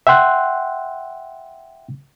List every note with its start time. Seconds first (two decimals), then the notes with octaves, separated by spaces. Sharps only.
0.07 E5 F#5 G5 C6 F#6